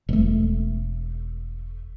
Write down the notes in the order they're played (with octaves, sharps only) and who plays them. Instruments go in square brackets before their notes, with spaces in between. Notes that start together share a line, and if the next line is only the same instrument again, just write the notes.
[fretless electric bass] E1 A3